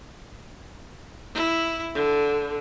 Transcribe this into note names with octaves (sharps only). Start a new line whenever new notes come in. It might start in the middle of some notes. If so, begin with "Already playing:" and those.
E4
D3